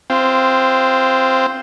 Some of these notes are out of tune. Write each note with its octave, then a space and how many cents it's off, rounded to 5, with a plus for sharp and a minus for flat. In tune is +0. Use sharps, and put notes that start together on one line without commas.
C4 +0 F4 -20